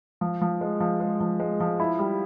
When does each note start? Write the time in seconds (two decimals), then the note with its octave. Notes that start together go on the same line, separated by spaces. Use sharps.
0.21 F3
0.41 F3
0.61 G#3
0.80 F3
1.00 G#3
1.20 F3
1.40 G#3
1.60 F3
1.80 E4
1.99 G3